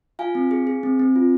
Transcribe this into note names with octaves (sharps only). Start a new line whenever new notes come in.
F4 F5 G#5
C4
G#4
G#4
C4
C4
F4